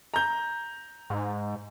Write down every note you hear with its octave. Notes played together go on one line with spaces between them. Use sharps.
A#5 G6
G#2